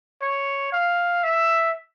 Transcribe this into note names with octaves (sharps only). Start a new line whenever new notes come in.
C#5
F5
E5